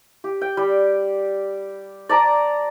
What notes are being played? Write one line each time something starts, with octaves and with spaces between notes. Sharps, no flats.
G4
G5
G3
D5 A5 A#5 D6